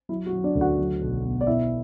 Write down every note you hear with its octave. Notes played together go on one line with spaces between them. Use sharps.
F#3 E4
F#4
F#3
D4 D5
D2
F#4 F#5
F#3
B1
B2
D5
B2 E4 E5